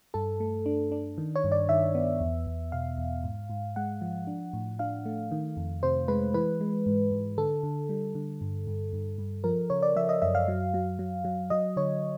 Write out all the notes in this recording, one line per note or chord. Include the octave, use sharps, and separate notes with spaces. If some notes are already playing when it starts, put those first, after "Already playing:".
G2 A4
A3
D4
D4
D#3
C#5
G2
D5
D#3 E5
B3
E2
E2
B2 F5
E2
G#2
G#2
G#3 F#5
F3
D4
A2
D4 F5
A3
D#3
F2
C3 C5
G#3 B4
E3 B4
G#3
G#2
G#2
D3 A4
D3
G3
D3
G2
G2
G2
G2
F3 A#4
C#3 C#5
D5
F3 E5
D#5
F#2 E5
F5
F#3
F#3
F#3
F#3
F#3 D#5
D3 C#5